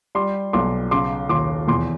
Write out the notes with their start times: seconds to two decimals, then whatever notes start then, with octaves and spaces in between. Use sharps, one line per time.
0.15 G3 C6 D6
0.53 B1 C6 D6
0.91 C#3 C6 D6
1.29 D#2 C6 D6
1.68 E2 C6 D6